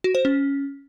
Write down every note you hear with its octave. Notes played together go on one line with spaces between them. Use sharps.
F#4
C5
C#4